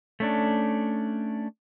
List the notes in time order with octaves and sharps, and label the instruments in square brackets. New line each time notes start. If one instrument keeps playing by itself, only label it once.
[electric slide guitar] A3 C#4 D4